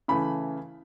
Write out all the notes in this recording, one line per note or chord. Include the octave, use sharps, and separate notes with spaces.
C#3 E3 A3 B5